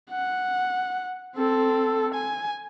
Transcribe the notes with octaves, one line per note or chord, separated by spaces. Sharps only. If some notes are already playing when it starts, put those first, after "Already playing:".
F#5
C4 A4
G#5